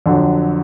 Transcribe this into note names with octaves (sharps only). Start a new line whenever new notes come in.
F2 D3 F#3